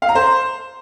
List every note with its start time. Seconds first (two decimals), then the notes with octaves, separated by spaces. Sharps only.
0.02 F5
0.09 A#5
0.15 C5